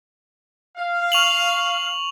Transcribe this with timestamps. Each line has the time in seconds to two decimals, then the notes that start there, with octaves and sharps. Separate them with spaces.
0.77 F5
1.12 C#6 F7 F#7